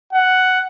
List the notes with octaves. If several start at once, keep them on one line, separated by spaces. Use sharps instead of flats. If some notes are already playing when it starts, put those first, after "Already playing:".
F#5